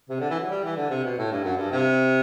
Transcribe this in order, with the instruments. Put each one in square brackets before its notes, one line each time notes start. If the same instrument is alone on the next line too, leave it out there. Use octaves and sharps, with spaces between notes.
[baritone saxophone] C3
D3
E3
F#3
G3
E3
D3
C3
B2
A2
G2
F#2
G2
C3